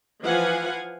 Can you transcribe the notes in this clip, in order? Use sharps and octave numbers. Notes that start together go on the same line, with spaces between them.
E3 F3 B4 F5 F#5 G#5